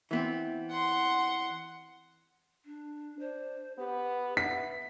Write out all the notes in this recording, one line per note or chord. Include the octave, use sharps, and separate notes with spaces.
E3 B3 C4
F#5 C6
D4
D4 C5
B3 G4
B3 E5 B6